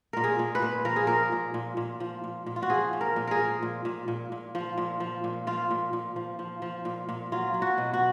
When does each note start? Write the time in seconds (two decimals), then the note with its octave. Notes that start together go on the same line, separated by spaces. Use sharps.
0.13 A#2 A#4
0.24 G#4
0.39 A#2
0.55 B4
0.62 A#2
0.85 F3 A#4
0.96 G#4
1.07 A#2 A#4
1.32 A#2
1.54 A#2
1.77 A#2
2.00 F3
2.24 A#2
2.46 A#2
2.56 F4
2.62 F#4
2.70 F3 G#4
2.93 F3
3.01 A#4
3.16 A#2
3.27 G#4 A#4
3.40 F3
3.62 A#2
3.85 A#2
4.08 A#2
4.32 A#2
4.55 F3
4.78 A#2
5.00 F3
5.24 A#2
5.47 F3 F4
5.71 A#2
5.93 A#2
6.16 F3
6.39 F3
6.62 F3
6.85 A#2
7.09 A#2
7.32 F#3 F4
7.54 F#3
7.62 F#4
7.78 B2
7.93 F#4